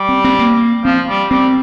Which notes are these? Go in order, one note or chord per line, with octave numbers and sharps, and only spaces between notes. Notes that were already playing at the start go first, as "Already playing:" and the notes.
Already playing: G3
C4
C4
A#3
F3 C4
G3
G3 C4